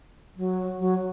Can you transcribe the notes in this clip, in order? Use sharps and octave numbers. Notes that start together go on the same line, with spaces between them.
F#3
F#3